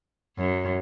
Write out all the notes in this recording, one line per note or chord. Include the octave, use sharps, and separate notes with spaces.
F#2